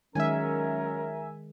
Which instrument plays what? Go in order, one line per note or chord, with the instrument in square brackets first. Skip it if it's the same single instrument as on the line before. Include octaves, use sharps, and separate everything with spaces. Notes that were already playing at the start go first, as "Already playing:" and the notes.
[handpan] D#3 G#3 [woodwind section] F#3 C#4 [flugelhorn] A#4 [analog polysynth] E5 G#5